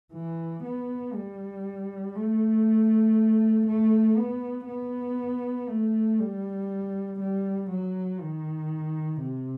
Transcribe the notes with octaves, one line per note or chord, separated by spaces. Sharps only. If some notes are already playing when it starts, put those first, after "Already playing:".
E3
B3
G3
A3
A3
B3
B3
A3
G3
G3
F#3
D#3
C3